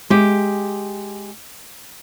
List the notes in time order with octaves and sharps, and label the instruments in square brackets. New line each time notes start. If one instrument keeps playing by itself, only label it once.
[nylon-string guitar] G#3 G4